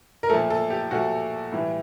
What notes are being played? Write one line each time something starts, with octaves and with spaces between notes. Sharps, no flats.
A#4
A#2 F3 A3 A4
A4
G4
A#2 F3 A3 F#4
A2 E3 G3